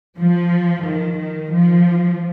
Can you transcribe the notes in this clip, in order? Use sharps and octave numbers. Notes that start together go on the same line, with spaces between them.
F3
D#3
D#3
F3